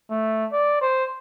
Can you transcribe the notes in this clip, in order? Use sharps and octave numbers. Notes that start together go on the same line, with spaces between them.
A3
D5
C5